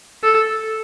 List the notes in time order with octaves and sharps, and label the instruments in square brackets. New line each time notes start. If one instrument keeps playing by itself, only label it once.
[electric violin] A4